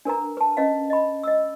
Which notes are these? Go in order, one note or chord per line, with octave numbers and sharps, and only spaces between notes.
D4 A#4 B4 A#5
B4 A5
C#4 B4 D#5 F5
D#5 B5
D#5 E6